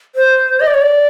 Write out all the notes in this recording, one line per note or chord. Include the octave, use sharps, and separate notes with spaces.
C5
D#5
D5
C#5
D5